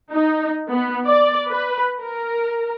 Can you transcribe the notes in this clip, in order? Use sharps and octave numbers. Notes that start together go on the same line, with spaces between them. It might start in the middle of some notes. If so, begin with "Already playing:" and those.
D#4
B3
D5
B4
A#4